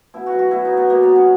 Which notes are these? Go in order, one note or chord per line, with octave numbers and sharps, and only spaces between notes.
B2 E4
F#4
F#3
F#4
B2 E4
D#4
F#3
B3
B2 A#3
B3
F#3
C#4